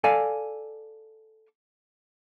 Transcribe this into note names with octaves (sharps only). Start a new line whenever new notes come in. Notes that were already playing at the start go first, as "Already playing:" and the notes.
A4 D5 F5 G#5